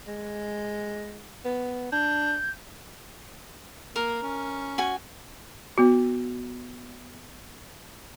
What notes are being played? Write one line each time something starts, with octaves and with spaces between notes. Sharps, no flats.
G#3
B3
D4 G6
A#3 A#4
C#4
F#4 G#5
B3 F#4